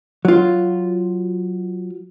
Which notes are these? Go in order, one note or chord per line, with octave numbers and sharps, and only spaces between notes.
F#3 F4